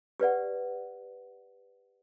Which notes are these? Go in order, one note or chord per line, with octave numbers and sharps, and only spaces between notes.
G4 B4 D5 F#5